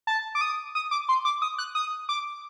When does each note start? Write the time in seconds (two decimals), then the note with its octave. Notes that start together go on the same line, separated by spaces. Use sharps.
0.07 A5
0.35 D6
0.41 D#6
0.75 D#6
0.91 D6
1.09 C6
1.25 D6
1.42 D#6
1.58 F#6
1.75 D#6
2.09 D6